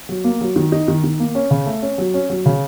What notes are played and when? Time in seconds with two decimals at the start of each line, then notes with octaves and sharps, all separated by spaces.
0.09 F#3
0.24 A#3
0.41 F#3
0.56 D#3
0.72 D#4
0.88 D#3
1.04 D#3
1.20 A#3
1.35 C#4
1.51 C#3
1.66 A3
1.82 C#4
1.98 F#3
2.14 C#4
2.30 F#3
2.46 C#3